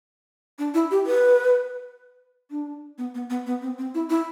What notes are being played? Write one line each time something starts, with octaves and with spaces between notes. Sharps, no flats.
D4
E4
G4
B4
D4
B3
B3
B3
B3
C4
C4
E4
E4